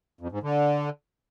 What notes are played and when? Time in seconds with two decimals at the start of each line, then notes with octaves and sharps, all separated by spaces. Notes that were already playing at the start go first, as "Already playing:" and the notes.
0.21 F2
0.32 G#2
0.43 D3